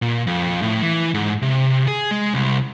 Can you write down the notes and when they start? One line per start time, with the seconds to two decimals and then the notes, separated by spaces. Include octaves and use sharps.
0.02 A#2
0.27 F2
0.62 A2
0.82 E3
1.14 G#2
1.42 C3
1.88 G#4
2.11 G#3
2.34 C2